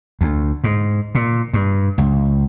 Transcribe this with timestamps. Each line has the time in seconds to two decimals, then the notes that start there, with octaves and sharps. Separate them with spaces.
0.21 D2
0.64 G#2
1.15 A#2
1.54 G2
1.98 C#2